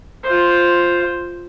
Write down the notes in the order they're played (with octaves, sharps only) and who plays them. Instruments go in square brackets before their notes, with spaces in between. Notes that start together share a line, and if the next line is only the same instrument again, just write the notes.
[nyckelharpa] F4 C5